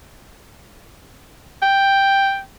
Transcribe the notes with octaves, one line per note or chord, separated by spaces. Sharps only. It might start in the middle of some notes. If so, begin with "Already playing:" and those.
G5